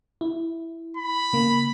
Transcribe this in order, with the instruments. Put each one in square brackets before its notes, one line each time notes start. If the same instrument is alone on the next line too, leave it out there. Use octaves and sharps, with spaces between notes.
[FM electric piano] E4
[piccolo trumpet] B5
[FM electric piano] C#3 A#3